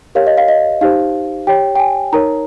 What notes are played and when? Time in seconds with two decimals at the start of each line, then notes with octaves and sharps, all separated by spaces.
0.15 G4 A#4 C#5 F5
0.27 D#5
0.37 F5
0.48 D#5
0.81 D#4 G4 C5 F5
1.47 G4 C#5 G5
1.76 G5
1.80 G#5
2.13 D#4 A#4 C#5 A#5